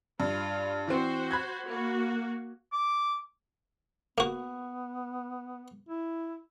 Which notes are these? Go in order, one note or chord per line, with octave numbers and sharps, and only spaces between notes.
G2 F4
E3 C4 F#4 C5
B5 F#6 G#6
A#3 F#4
D6
A#3 B3 F#4
E4